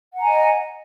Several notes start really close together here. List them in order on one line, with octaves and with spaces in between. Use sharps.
F#5 A#5 G#5 D#5